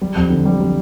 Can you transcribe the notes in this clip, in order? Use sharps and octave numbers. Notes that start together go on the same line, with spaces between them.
G3
F2
D3
G3
G3